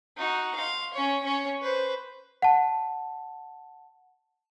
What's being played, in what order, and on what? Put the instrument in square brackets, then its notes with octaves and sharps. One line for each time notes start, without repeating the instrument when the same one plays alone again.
[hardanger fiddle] D#4 F#4
F5 C6
C#4 C#5
C#4 C#5
B4 C5
[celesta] F#5 A5